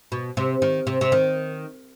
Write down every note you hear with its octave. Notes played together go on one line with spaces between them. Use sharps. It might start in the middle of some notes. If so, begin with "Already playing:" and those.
B2
C3
D#3
C3
C3
D#3